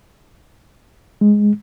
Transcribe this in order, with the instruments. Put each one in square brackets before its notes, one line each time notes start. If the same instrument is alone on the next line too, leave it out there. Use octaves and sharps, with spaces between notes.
[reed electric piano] G#3